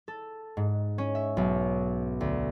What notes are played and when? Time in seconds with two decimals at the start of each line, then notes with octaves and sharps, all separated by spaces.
0.08 A4
0.57 G#2
0.98 C#4
1.15 E5
1.37 B1
2.21 D2